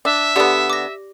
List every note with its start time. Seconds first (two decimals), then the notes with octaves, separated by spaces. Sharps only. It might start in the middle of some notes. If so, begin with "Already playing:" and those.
0.05 D4 E5
0.36 D3 B3 G4 D5
0.70 D6 A#6